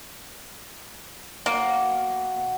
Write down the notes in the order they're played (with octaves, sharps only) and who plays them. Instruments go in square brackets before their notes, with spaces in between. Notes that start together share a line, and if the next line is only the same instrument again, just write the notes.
[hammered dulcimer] F#3 B3 [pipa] A#3
[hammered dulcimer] B2